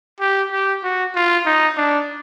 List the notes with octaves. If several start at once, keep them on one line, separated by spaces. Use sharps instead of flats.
G4
G4
F#4
F4
D#4
D4